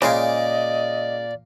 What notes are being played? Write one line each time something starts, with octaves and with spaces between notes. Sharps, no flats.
A#2 C#3 G#3 A#4 D5 D#5 G5